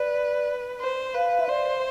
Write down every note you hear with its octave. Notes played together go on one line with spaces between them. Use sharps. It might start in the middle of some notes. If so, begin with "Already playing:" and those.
Already playing: B4 D5
C5
B4 F5
E5
C5 D5